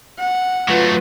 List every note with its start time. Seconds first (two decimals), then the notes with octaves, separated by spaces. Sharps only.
0.19 F#5
0.68 F#3 A3 F4 B4